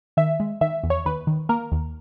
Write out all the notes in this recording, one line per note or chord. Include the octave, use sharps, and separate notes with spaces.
D#3 E5
G#3
D#3 E5
E2
C#5
D#2 B4
D#3
A#3 A#4
D#2